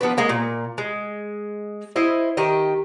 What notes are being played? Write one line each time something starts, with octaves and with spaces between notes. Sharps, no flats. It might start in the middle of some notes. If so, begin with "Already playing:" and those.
F3 B3 D4 B4
G#3 A#3 C4
A#2
G#3
E4 C5 D#5
D#3 G4 D#5